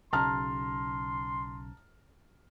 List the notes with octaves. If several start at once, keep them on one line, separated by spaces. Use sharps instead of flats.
B1 C#3 A5 A#5 C6 F6